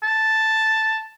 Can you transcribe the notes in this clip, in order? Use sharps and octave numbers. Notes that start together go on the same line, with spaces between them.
A5